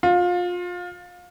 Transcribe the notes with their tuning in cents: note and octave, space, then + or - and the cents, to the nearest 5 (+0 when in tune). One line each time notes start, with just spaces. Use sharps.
F4 +25